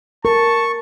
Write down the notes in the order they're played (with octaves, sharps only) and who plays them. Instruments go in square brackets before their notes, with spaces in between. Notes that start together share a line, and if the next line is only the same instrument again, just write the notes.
[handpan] A#4 [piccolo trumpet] A5 [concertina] C#6